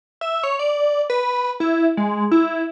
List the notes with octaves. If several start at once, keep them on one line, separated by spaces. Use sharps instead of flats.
E5
C#5
D5
B4
E4
G#3
E4